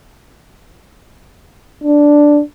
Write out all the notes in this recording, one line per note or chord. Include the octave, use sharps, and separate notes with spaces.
D4